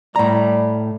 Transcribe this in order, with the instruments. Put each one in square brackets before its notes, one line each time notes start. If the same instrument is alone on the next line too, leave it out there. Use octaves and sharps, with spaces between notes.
[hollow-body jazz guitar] A2 A#5 [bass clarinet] G3